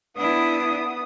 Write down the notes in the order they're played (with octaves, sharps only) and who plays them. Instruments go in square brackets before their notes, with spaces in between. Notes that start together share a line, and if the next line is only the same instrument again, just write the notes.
[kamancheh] B3 D#6 [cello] D4 E4